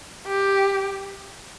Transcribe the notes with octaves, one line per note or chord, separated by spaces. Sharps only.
G4